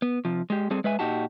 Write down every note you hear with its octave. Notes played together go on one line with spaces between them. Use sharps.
B3
C3 F3
G#3 G4
G3 C4 G#4 A4
G#3 B4 E5 G#5
A#2 D#4 F#4 G4 A5